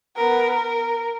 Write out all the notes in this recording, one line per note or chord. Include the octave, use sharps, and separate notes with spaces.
B3 A#4
A#4